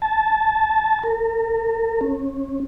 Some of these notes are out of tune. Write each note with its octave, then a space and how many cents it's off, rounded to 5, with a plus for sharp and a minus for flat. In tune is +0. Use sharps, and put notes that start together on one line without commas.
A5 -15
A#4 -45
C#4 -30